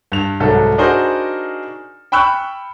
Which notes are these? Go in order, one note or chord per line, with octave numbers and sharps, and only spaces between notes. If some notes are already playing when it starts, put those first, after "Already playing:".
G2 F7
C2 G#2 F#3 A4
D4 D#4 F#4 G#4 A#4 C5
G5 B5 C#6 E6 F#6